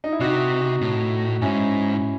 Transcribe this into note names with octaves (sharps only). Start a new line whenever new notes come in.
D#4
E4
C3 D#4 F#4
A2
G#2 C#4 E4